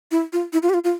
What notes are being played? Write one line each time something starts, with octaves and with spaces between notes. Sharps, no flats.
E4
F4
E4
F4
G4
F4
F4